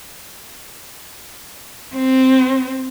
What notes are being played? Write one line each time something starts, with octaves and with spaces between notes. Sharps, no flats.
C4